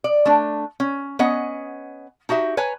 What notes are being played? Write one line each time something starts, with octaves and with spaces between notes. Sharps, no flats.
D5
A3 D4
C#4
B3 C#4 D#5 F#5
D#4 F#4 G4 E5
B4 C#5 G#5 A#5